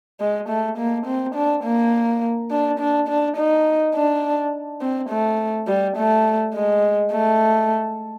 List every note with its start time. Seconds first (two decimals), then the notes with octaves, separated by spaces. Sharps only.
0.20 G#3
0.49 A3
0.78 A#3
1.06 C4
1.35 D4
1.64 A#3
2.51 D4
2.79 D4
3.08 D4
3.37 D#4
3.95 D4
4.81 C4
5.10 A3
5.67 G3
5.97 A3
6.54 G#3
7.12 A3